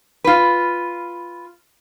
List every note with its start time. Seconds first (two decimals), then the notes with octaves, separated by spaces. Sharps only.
0.24 F4 B4